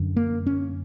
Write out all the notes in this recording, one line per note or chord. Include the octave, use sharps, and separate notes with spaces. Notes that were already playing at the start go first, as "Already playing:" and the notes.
Already playing: F#2 D3
A#3
C#4